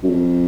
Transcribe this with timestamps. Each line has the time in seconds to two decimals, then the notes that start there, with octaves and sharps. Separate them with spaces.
0.03 F#2
0.10 F2